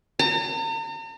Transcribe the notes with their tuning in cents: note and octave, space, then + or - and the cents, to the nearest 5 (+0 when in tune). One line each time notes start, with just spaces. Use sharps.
A#5 -45